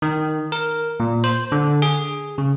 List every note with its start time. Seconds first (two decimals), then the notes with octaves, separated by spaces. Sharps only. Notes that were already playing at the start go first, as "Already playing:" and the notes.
0.02 D#3
0.52 A#4
1.00 A#2
1.24 C5
1.52 D3
1.82 G#4
2.38 C#3